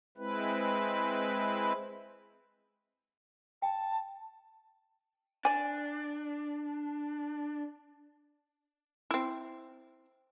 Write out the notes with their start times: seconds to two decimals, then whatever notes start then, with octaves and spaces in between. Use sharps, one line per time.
0.17 G#3 C4 E4 B4
3.62 G5 A5
5.45 D4 D5 G#5
9.11 C4 E4